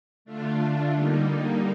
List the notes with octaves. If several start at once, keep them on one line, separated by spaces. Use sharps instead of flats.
D3 A3 D4 F4
D3 G3 A#3 D#4